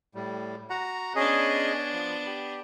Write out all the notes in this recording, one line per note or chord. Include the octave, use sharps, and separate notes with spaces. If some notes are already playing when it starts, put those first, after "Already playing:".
A2 G3
F#4 F#5 A#5
B3 C#4 D4 G#4 D#5
F3
G4